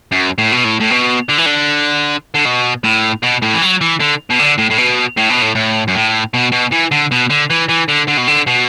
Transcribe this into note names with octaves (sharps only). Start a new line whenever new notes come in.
F#2
A2
B2
A2
A2
B2
D3
E3
D3
D3
B2
A2
B2
A2
E3
F#3
E3
D3
B2
D3
A2
A2
B2
A2
B2
A2
A2
F#2
A2
B2
B2
E3
D3
B2
D3
E3
E3
D3
D3
B2
D3
B2